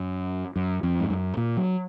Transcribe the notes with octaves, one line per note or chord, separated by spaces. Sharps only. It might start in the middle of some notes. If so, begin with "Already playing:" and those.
Already playing: F#2
F#2
F2
G#2
F#2
A#2
F#3